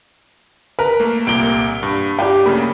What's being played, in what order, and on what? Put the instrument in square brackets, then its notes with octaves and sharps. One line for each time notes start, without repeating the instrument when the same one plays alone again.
[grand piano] A#4 [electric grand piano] B4
[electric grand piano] A3 A#3
[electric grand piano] C2 A#2 A#3 [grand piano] D7 G7
[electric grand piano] G2
[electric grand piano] G2 [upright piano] G4 D5 G5
[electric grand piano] C#3 A3 A#3 [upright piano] B5